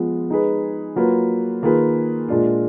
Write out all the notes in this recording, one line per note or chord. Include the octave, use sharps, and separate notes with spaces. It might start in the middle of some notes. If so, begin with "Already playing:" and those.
Already playing: F3 G#3 B3 F4
G#3 D#4 G#4 B4
F#3 A#3 F4 B4
D#3 A#3 F4 G#4 B4
A#2 G#3 D4 F4